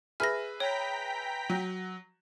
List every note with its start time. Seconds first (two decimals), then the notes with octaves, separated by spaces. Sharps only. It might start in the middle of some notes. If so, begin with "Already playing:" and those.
0.20 G#4 B4 E5 F6 A#6
0.60 C#5 G5 A#5 B6
1.50 F#3